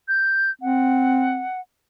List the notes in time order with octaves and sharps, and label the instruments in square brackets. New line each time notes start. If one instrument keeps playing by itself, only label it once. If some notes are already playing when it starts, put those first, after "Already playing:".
[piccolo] G6
[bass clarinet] C4 [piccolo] F#5